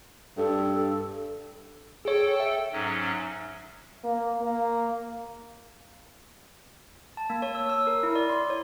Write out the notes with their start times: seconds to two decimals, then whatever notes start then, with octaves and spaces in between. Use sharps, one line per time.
0.37 G2 A4
2.05 G#4 A4 C#5 G5
2.40 E5
2.72 G#2 F#3 C#4
4.04 A#3
4.42 A#3
7.17 A5
7.30 A#3
7.42 C#5
7.55 E6
7.70 E6
7.87 A#4
8.03 E4
8.16 D5
8.30 C6
8.50 C#5